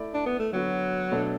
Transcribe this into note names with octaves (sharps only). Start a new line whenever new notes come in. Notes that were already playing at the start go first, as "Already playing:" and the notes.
Already playing: A3 E4 D5
D4
B3
A3
D3 F#3 B3 F#4
B2 A3 D4 A4